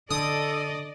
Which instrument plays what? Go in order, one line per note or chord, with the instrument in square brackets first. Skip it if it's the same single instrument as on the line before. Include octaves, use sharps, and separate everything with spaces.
[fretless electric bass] D3 [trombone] A4 [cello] D5 D#5 [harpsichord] D#6